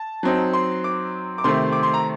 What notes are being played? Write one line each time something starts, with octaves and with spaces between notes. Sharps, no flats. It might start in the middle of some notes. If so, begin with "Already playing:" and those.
Already playing: A5
F#3 C4 D#4
C6
D6
D6
C3 D#3 A3 C4 C6
D6
C6
A#5